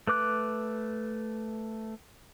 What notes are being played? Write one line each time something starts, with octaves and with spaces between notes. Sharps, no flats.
A3 B4 D6 F#6